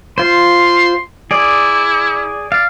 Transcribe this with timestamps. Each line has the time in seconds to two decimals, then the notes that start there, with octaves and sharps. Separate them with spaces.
0.18 F4 C5 C6
1.31 E4 G#4 D5
2.52 D5 F5